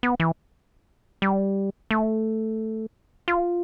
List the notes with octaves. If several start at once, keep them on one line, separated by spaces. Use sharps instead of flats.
B3
E3
G3
A3
F4